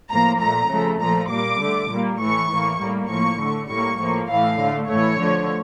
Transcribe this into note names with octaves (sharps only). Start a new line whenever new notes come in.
A2 F3 A#3 A#5
A#2 A3 A#5
C#3 F3 A3
A#2 F3 A3 A#5
A#2 G3 A#3 D6
D3 A3
A#2 G3 A#3
A2 E3 A3 C#6
A2 E3 A#3
A2 G3 A#3
A2 F3 A#3 C#6
D3 A3
A2 G3 A#3 C#6
A2 F3 A#3
A2 E3 A3 F5
D3 A3
A2 E3 A3 C#5
D3 F3 A3